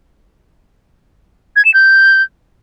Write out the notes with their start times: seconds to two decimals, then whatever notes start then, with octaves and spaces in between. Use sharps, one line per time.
1.56 G#6
1.65 E7
1.74 G6